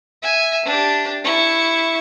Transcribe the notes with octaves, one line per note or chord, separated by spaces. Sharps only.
E5 G#5
D4 G4
E4 C#6